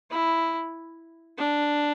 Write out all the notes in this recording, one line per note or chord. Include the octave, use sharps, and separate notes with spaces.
E4
D4